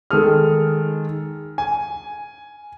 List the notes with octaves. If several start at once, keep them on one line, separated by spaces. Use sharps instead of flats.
D#3 G#3 G#4 A4 D#6 F6
G#5